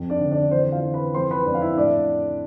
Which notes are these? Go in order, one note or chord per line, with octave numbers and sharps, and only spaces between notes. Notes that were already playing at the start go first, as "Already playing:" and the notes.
Already playing: F2
D4 D5
D3
D4 D5
E3 C5
F4 F5
E3
B4 B5
F2 C5 C6
B4 B5
F2 D4 D5
F5
E4 E5
A2 D4 D5